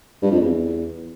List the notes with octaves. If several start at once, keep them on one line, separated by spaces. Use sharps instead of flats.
G2
F2
E2